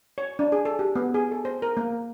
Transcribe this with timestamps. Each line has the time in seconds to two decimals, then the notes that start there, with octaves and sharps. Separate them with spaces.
0.18 C#5
0.39 D4
0.52 G#4
0.65 A4
0.79 G4
0.96 B3
1.14 G#4
1.32 A4
1.45 C5
1.62 A#4
1.77 A#3